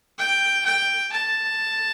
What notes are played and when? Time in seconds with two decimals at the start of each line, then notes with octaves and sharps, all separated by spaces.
0.18 G5
0.66 G5
1.12 A5